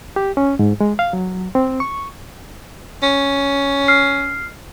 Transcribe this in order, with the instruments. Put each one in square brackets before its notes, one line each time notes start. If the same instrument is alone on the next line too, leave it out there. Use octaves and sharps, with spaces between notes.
[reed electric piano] G4
C#4
G#2
G#3
F5
F#3
C4
C#6
[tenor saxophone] C#4
[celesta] F6 C7